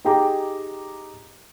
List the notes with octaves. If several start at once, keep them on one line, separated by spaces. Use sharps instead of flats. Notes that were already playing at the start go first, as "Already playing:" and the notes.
D#4 G4 G#4 G5 A#5 D6